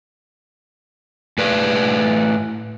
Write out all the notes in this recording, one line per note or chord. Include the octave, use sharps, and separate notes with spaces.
A2 B4 D5